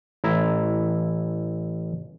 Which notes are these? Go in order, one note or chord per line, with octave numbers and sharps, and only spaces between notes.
A1 E4 A#5